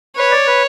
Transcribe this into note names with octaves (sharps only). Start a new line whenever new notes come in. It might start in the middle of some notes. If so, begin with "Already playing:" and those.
B4 C#5
D5
B4